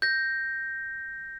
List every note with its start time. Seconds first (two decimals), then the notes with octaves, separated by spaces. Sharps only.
0.02 G6 A#6